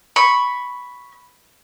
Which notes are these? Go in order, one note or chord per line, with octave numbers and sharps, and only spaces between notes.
B5 C#6